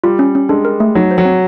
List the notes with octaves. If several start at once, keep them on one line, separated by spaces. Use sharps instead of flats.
G3 F4
C#4
C#4
G#3 D4
A#4
A3
F#3 D#4
C5
F#3
C4